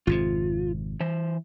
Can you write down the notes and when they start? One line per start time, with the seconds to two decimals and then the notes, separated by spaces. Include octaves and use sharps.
0.07 G#1 F2 C3 F4
1.00 E3 C5